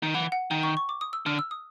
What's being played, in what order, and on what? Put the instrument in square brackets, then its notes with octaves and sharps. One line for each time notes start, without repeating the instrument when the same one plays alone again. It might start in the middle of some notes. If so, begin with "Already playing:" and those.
[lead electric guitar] D#3
[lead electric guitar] E3 [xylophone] F#5
[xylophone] F#5
[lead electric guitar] D#3 [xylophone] G5
[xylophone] C#6
C#6
D6
D#6
E6
[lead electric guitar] D3 [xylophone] F6
[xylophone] E6
D#6